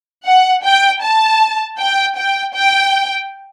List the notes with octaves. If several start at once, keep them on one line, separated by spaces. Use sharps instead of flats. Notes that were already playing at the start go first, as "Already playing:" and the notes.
F#5
G5
A5
G5
G5
G5